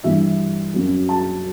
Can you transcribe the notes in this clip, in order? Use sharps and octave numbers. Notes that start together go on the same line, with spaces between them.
G2 E3 G3 E5
F#2 C#3 F#3
A5